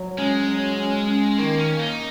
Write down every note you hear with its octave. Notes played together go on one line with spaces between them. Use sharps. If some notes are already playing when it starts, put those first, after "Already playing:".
Already playing: F#3
G#3 C#4
F#3
C#4
C#4
D#3 A#3
C#4
A#3
D#4